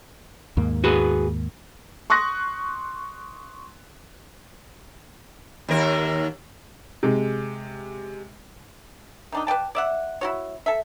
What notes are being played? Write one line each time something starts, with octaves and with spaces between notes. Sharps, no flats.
D#2 G#2 A#3
F#4 G#4 B4
C6 C#6 D#6 F#6 A#6
D#2 A#4
C3 G#3
D#3 D4 D#4
B4 D5 G5 A5
D5 E5 F#5
E4 F#4 C#5
A4 E5